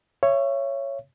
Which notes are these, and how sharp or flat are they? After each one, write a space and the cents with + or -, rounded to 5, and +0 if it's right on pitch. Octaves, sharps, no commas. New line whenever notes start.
C#5 +0 E5 +35